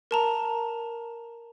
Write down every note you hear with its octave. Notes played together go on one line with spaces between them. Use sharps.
A#4 A5 A#5